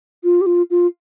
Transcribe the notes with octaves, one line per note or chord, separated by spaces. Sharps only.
F4
G4
F4
F4